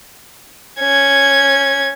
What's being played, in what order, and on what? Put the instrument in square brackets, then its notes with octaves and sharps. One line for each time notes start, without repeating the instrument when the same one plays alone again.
[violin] C#4 G#6